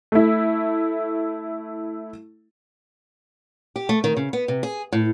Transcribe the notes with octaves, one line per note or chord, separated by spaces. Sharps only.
A3 E4
G4
A3
D#3
C#3
B3
C3
G#4
A2